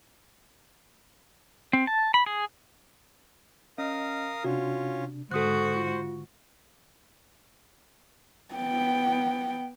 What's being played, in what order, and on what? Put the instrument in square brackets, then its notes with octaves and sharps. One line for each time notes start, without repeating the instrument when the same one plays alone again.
[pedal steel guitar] C4
A5
B5
G#4
[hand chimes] C#4 [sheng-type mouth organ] A#4 F5 D#6 [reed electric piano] D#5
[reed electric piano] C3 D4 [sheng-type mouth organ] C#4 F4 [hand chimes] F#4
[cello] G#2 F#4 [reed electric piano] D3 C#6 [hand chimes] A4 D#6 F#6 [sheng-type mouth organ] C5
[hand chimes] F4
[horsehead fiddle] B3 G5